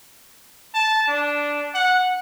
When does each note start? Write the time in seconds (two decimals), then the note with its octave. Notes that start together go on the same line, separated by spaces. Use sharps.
0.74 A5
1.08 D4
1.75 F#5